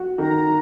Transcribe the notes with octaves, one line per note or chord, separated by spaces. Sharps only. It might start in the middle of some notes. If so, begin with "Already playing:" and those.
Already playing: F#4
D#3 A#5